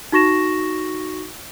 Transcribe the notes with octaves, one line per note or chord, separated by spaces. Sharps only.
D#4 F#4 C#6 A#6 E7